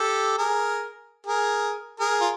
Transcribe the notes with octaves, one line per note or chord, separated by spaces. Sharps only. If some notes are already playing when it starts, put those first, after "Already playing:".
Already playing: G4 A4
G#4 A#4
G#4 A#4
G#4 A#4
F4